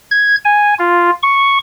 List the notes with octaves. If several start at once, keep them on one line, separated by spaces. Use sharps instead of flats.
G#6
G#5
F4
C#6